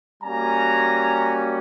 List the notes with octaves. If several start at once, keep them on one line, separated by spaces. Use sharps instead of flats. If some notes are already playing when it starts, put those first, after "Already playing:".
G3 A#3 C#4 F#4 G#5 A#5